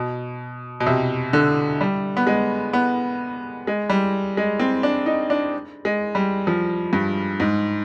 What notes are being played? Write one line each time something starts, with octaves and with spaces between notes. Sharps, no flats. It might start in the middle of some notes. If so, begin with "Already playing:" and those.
Already playing: B2
B2
C3
D3
G3
B3
G#3
B3
G#3
G3
G#3
C4
D4
D#4
D4
G#3
G3
F3
G2
G#2